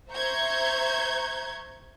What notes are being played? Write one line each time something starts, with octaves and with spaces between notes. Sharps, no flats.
C5 E5 A#5 C#6 G6 G#6